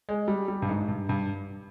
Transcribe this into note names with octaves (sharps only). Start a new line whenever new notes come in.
G#3
G3
G3
G2
G#2
G2
G2